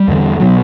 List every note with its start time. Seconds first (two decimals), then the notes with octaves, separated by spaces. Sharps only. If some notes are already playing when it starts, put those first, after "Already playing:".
Already playing: G3
0.08 E2 D3
0.40 B2 F#3